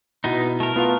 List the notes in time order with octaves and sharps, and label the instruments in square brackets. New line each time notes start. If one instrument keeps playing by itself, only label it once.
[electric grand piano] B2 E4 [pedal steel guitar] B3 D#4
[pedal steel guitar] A3 A#4
[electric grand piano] B3 F4 F5